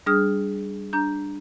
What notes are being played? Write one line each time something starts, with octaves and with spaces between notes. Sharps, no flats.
G3 D4 G#4 D#6 F6
D4 A#5 G6